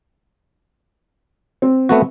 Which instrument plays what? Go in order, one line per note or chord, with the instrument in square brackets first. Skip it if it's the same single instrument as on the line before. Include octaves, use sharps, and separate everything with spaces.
[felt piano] C4
[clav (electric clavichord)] A3 B3 F#4